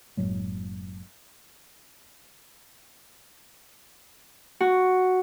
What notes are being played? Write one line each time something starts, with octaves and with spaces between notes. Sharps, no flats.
F#1 A2 F#3 G#3
F#4